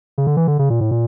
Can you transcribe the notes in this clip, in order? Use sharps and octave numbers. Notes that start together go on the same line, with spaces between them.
C#3
D3
E3
D3
C#3
A#2
A2
A#2